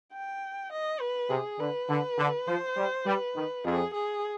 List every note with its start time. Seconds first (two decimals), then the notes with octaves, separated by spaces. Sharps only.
0.13 G5
0.72 D#5
1.00 B4
1.30 C3 G#4
1.59 D3 B4
1.89 D3
2.18 D3
2.47 F3 C5
2.77 G3
3.06 G3 B4
3.35 D#3
3.64 F2 G#4
3.94 G#4